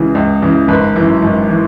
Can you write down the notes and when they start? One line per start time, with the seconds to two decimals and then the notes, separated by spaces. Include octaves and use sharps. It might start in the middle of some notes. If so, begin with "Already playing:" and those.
Already playing: C#2 C#3 E3 G#4
0.15 C#2
0.42 C#3 E3
0.68 G#1 B4
0.95 F#2 E3
1.22 G#1
1.49 E3